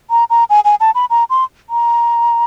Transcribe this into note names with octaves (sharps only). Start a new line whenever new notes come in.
A#5
A#5
G#5
G#5
A5
B5
A#5
C6
A#5